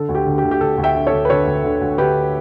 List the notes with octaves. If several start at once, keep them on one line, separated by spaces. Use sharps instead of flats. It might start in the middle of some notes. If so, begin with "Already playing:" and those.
Already playing: D3 A4
D2
G4
D3
G4
D2
G4
D3 A4
D2
E5 G5
D3
A4 C#5
D2
B4
D3 A4 C#5
D2
D3
D2
D3 G4 B4